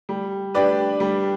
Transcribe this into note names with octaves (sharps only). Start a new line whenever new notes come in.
G3
D4 G4 B4 D5
G3